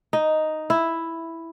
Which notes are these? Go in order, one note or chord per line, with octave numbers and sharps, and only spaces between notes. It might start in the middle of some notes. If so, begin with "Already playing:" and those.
D#4
E4